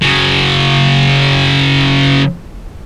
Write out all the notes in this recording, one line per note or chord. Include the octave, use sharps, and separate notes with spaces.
C#3 F#3